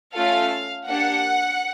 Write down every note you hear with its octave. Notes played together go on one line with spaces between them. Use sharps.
A3 C#4 F4 A4 F5
A#3 D4 G4 F#5